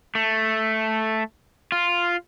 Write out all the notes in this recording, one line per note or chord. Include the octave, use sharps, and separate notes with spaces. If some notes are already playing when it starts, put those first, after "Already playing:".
A3
F4